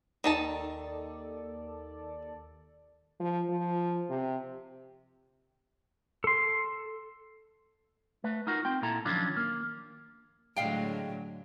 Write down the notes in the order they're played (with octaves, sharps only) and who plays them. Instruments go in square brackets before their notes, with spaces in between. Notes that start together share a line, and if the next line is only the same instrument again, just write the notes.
[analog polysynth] D#2 A4 D5 [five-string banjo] D#3 D#4 A5
[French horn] F3
F3
C3
[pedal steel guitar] A4 C6
[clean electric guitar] A3 B4
D#4 F4 F#4 A#4
C4 G5
A#2 E4 A4 A#5
D#3 F3 F#3 C#4 D4 F4
A#3
[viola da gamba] A2 D3 F#3 [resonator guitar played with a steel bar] G#3 F5 G5